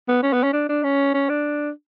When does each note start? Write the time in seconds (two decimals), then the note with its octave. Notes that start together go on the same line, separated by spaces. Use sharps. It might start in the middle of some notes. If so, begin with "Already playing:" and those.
0.08 B3
0.23 C#4
0.33 B3
0.44 C#4
0.53 D4
0.69 D4
0.84 C#4
1.14 C#4
1.30 D4